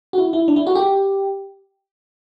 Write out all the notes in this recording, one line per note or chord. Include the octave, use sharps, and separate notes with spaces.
F#4
E4
E4
D4
E4
F#4
G4